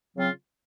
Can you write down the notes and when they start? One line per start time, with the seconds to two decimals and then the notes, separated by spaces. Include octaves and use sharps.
0.16 C#3 F#3 C4 F4